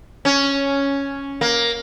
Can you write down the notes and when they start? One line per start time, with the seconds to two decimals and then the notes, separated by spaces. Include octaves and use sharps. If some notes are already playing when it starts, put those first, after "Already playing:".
0.25 C#4
1.41 A#3